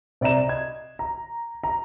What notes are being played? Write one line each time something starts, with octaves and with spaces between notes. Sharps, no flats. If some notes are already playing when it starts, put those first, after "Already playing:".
C3 D5 E5 A#5 E7
D#5 G#6
A#5
A#5